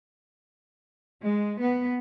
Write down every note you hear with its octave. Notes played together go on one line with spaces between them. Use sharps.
G#3
B3